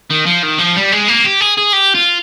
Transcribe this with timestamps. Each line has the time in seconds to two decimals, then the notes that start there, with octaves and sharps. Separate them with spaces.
0.10 D#3
0.26 F3
0.43 D#3
0.58 F3
0.76 G3
0.92 G#3
1.08 A#3
1.24 G4
1.40 G#4
1.57 G#4
1.73 G4
1.95 F4